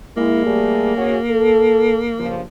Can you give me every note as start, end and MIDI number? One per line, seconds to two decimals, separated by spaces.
0.17 0.44 56
0.17 2.45 58
0.17 0.44 64
0.46 0.94 55
0.46 0.94 57
0.46 0.94 68
0.96 1.18 61
0.96 1.18 66
0.96 1.18 68
1.30 2.00 69
2.19 2.40 43
2.19 2.40 49
2.19 2.40 53